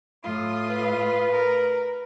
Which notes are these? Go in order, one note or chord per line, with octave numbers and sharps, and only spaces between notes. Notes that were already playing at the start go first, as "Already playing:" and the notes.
A2 F4 D#6
B4
A#4